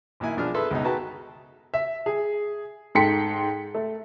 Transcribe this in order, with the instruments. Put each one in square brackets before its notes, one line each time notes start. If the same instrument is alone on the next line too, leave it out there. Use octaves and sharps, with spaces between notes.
[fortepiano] A#1 D#3 A#3 E4 G#5
B1 F3 D4 G#4 F6
G#4 A4 B4 E5 C6
C#2 B2 D#4
F#4 G#4 B4 G5 A5 A#5
[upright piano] E5
G#4
G#2 A4 G5 C6 B6 C#7
A3